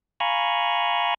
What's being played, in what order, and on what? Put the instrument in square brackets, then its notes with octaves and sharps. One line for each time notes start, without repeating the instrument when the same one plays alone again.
[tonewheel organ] F5 G#5 A#5 B5 C#6